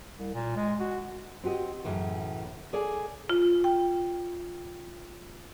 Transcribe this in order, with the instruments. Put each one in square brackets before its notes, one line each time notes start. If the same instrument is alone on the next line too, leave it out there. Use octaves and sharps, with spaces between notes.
[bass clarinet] C2
A#2
G#3
F#4
[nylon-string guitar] C4 F#4 G4 D#5
F#2 A2 C#3 E3
G#4 A4 C#5 D5 F5 G#5
[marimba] F4
G5